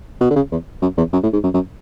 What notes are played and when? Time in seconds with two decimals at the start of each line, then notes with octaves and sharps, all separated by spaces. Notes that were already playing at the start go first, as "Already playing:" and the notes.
0.21 B2
0.30 D3
0.36 C#3
0.52 E2
0.82 F#2
0.97 E2
1.13 F#2
1.23 A2
1.33 G#2
1.44 F#2
1.54 F#2